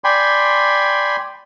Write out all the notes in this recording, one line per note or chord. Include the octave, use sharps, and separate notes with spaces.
D5 G5 G#5 B5 C6